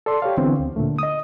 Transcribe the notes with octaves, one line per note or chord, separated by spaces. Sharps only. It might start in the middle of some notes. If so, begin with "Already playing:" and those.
A4 D5 C6
G4 C#5 F5
D3 E3 B3 C4
D2
A#2 D3 A3
D#5 D#6